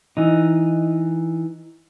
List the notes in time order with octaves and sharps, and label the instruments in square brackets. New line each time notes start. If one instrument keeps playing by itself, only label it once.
[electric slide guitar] E3 D#4